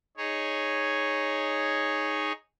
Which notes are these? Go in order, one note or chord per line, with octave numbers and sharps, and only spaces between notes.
D#4 G#4 C#5